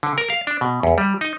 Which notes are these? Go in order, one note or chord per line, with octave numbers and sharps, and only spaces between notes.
D3
A#4
F5
D4
B2
E2
G3
D#4